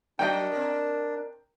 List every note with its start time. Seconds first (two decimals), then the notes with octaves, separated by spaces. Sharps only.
0.19 F#3 D4 A#4 D#5 G5
0.52 C4 A#4